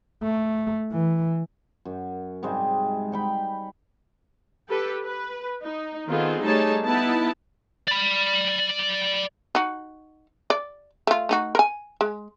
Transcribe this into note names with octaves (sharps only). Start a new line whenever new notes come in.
A3
E3
F#2
G#2 C3 G3 G#3
D#4 G5 B5
G4 A4 B4
B4
D#4
D#3 B3 C4 F4 G#4 A4
G3 A3 D#4 G#4 C#5 A5
B3 D#4 E4 A5 B5
D5 B5
D#4 F#4
D5
A3 F4
A3 D#4 F#4
A#4 G#5
G#3